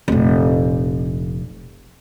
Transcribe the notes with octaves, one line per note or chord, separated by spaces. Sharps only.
F1 A#1